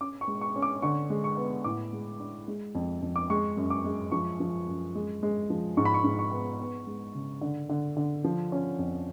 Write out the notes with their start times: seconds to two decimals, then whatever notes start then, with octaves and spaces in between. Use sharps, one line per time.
0.01 C#4 D6
0.21 C#6
0.28 G#3
0.41 C#6
0.56 C#4
0.62 D6
0.82 D3 C#6
1.10 G#3
1.24 C#6
1.37 B3
1.64 A2 D6
1.93 G#3
2.20 D4
2.48 G#3
2.75 F2
3.02 F2
3.16 D6
3.30 G#3 C#6
3.57 F#2
3.70 D6
3.85 G#3
4.12 F3 C#6
4.40 F3
4.68 F#2
4.95 G#3
5.23 G#3
5.50 F3
5.77 G#2 C#6
5.85 B5
5.94 C#6
6.04 G#2
6.19 C#6
6.31 B3
6.60 B3
6.87 G#3
7.15 C#3
7.41 D3
7.69 D3
7.97 D3
8.25 F3
8.52 C#4
8.79 F2